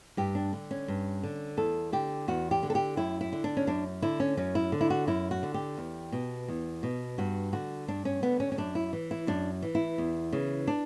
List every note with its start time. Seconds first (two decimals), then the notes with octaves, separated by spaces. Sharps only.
0.17 G2 G4
0.35 D4
0.53 D3
0.71 C#4
0.88 G2
1.23 D3
1.57 E2 A4
1.92 D3 G4
2.28 E2 F#4
2.51 G4
2.63 D3
2.70 A4
2.75 G4
2.97 F#2 E4
3.21 E4
3.33 D3
3.44 D4
3.57 C#4
3.67 F#2 D4
4.02 D3 E4
4.20 C#4
4.37 F#2 C#4
4.55 E4
4.72 D3
4.81 E4
4.90 F#4
5.07 F#2 E4
5.31 F#4
5.43 D3
5.54 G4
5.77 E2
6.12 B2
6.48 E2
6.83 B2
7.18 G2 F#4
7.53 D3 F#4
7.88 G2 D4
8.05 C#4
8.22 D3 B3
8.40 C#4
8.52 C#4
8.58 F#2 D4
8.75 E4
8.93 E3
9.11 E4
9.27 F#2 D4
9.62 E3
9.75 E4
9.98 E2
10.32 C#3 E3
10.67 D4